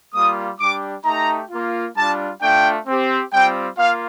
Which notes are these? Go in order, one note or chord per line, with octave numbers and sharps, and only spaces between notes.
G3 A#3 F4 D#6
G3 D4 G4 D6
A3 D#4 G4 A#5
A#3 F4
G3 D4 F4 A5
A3 D4 F4 G5
C4 G4
G3 C4 F4 G5
A#3 F4 F5